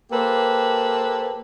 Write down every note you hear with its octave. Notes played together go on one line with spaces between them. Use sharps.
A#3 G4 A4 B4 C5